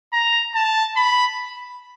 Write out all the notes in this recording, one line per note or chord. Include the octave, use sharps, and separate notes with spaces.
A#5
A5
B5